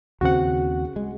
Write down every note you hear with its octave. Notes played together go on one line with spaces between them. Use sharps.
D#2 C#3 C4 F#4 F#5
G#3